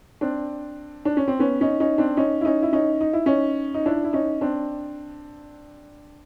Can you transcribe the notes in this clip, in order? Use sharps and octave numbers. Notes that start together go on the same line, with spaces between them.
C4 D4
D4
C#4
C4
B3 C#4
C#4 D#4
C#4 D#4
C4 D4
C#4 D#4
E4
C#4 D#4
E4
C#4 D#4
D#4
E4
C#4 D#4
D#4
D4 E4
E4
C#4 D#4
C4 D4